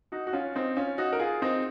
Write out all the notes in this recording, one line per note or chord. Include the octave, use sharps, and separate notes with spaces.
D#4 F#4
F#4
C#4 F4
C4 D#4
C#4 F4
D#4 F#4
A#4
F4 G#4
C4 D#4